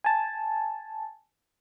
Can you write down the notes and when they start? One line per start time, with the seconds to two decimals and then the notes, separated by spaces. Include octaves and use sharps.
0.04 G#5 A5